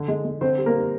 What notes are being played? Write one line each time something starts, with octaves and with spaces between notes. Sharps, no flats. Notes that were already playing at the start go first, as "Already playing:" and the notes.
Already playing: D3
G#3
G#3
D3 C4 C5
G3
A#3 A#4
G3